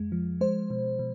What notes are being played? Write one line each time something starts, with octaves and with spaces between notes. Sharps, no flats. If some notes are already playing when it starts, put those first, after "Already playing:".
Already playing: F2 G#3
F3
G#3 C5
B2
B2